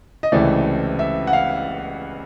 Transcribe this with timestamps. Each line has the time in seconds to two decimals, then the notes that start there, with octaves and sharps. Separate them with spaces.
0.23 D#5
0.32 C#2 C3 E3 A3 D5
0.99 E5
1.27 F#5
1.33 F5